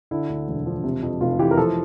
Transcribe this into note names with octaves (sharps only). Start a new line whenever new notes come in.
D3 E4
D2
E1
F3
C3
F2
F1 F4
E3 G4
A#4
F3 A4